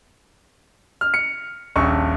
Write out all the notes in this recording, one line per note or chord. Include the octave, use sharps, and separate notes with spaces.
F6
C#7
D#1 A#1 C#6